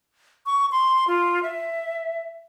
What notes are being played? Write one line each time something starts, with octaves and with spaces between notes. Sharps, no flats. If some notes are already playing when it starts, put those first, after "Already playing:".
C#6
C6
F4
E5